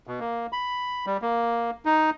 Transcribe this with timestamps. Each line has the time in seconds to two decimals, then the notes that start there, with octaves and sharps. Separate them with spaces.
0.07 B2
0.20 A#3
0.53 B5
1.07 G3
1.22 A#3
1.85 D#4